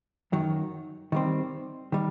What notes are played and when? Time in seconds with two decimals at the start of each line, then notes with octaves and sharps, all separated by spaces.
0.32 F#2 D#3 F#3
1.12 D#3 G3 C4
1.92 D#3 G3